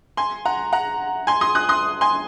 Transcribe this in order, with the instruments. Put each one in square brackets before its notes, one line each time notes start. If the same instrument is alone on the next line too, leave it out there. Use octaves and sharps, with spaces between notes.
[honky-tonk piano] G#5 C6
F#5 A#5
F#5 A#5
G#5 C6
C6 D#6
D#6 F#6
C6 D#6
G#5 C6